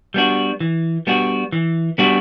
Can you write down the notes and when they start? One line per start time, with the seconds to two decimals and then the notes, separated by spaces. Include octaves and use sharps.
0.14 G3 B3 D4 F#4
0.60 E3
1.07 G3 B3 D4 F#4
1.52 E3
1.98 G3 B3 D4 F#4